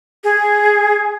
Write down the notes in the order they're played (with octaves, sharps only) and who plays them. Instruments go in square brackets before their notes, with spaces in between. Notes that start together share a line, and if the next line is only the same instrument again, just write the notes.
[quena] G#4